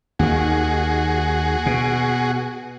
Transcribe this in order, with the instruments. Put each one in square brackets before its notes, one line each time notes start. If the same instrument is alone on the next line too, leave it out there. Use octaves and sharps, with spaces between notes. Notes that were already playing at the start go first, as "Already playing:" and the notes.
[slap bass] D#2 D#3 [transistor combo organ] F#4 G#4
[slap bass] B2